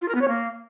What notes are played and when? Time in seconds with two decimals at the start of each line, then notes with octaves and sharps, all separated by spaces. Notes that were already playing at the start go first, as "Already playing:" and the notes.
0.01 F4
0.08 A#4
0.15 B3
0.21 C#5
0.28 A#3